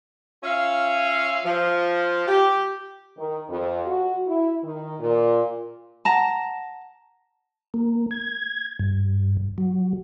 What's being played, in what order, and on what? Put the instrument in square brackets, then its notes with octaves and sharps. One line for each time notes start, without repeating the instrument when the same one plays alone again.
[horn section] C#4 F4 E5 F5
F3
G4
[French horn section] D#3
F2
F#4
E4
D#3
A#2
[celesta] F#5 A#6 E7 [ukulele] A5 A#5
[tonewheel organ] A#3
G#6
G2
F#3